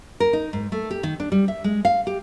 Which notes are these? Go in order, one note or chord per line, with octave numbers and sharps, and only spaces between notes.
A#4
D#4
G#2
A3
G4
D#3
D4
G3
E5
G#3
F5
G4